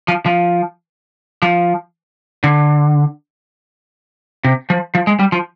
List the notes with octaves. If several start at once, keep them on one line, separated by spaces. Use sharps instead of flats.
F3
F3
F3
D3
C3
F3
F3
G#3
G3
F3